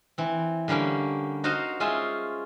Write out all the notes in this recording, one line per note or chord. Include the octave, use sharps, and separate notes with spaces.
E3 C4
D3 G3 A#3 C#4 G4
D#4 F#4 C5 D#5 F5 A#5
G#3 C#4 F4 G#4 C5 E5